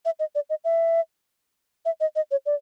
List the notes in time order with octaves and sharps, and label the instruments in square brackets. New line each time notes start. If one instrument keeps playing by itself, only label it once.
[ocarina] E5
D#5
D5
D#5
E5
E5
D#5
D#5
C#5
D5